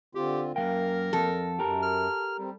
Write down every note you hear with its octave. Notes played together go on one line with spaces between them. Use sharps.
D3 C4 F4 G4
F#2 E3 A#3 A#4 F5 G5
F2 A4
F#2 G4 A#4
F6
G3 C4